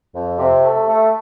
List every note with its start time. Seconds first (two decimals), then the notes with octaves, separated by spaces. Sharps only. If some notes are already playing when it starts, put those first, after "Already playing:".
0.14 F2
0.38 C3
0.64 A3
0.88 A3